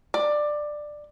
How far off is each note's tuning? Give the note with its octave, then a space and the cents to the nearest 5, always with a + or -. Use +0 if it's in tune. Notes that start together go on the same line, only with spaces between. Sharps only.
D5 +15